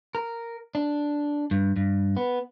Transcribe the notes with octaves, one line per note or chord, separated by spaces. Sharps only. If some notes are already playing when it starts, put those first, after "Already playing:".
A#4
D4
G2
G2
B3